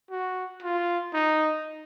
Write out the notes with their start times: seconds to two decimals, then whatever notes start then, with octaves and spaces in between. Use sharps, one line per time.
0.11 F#4
0.62 F4
1.13 D#4